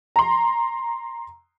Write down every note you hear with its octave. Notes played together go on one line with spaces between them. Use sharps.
A#5 C6